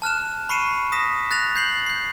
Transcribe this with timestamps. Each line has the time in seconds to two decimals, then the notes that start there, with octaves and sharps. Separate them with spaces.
0.02 A5 F6 F#6 E7
0.49 B5 C#6 C7 C#7 D#7 E7
0.92 D#6 A#6 B6 E7
1.31 F#6 A6 A#6 F7
1.56 G6 C7 F#7
1.86 G6 C7